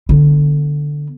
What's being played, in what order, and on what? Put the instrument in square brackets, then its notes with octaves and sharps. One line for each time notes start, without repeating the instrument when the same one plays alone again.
[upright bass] D3 B3